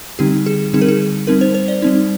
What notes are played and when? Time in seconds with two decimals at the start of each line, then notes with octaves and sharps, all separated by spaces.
0.19 D3 G3 C4 D#4 G4
0.46 G#4
0.73 D3 G3 C4 D#4 G#4
0.81 A#4
0.88 G#4
1.27 G3 C4 D#4 A#4
1.41 C5
1.54 C5
1.68 D5
1.82 G3 C4 D#4